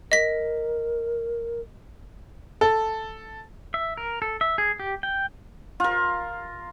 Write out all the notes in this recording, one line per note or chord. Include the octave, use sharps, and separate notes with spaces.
A#4 D#5 B6
A4
E5
A#4
A4
E5
G#4
G4
G5
F4 A#4